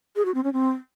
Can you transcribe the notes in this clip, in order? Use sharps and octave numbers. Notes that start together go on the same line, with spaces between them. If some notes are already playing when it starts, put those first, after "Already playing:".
G#4
F#4
C4
C#4
C4